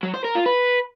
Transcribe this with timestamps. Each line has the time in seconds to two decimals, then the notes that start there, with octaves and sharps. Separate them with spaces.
0.03 F#3
0.14 C5
0.24 A#4
0.35 F4
0.46 B4